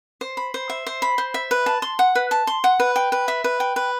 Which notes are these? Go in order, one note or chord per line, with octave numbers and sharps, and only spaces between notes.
C5
B5
C5
E5
C5
B5
C5
E5
B4
A5
C6
F#5
B4
A5
C6
F#5
B4
G5
B4
E5
B4
G5
B4